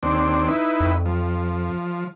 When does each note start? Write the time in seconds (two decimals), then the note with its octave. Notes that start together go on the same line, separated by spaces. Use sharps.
0.03 D#2 C4 D4
0.48 D#4 E4 B4
0.81 F2
1.06 F3